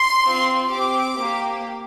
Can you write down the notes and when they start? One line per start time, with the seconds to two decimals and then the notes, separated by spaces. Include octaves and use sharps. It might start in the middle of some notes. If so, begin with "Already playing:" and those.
Already playing: C6
0.24 C4 F4
0.70 C4 G4 D6
1.18 A#3 G4